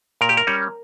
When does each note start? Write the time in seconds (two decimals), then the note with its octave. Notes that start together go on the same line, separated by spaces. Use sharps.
0.21 A#2 A#4
0.29 G4
0.37 A#4
0.47 G3 C#4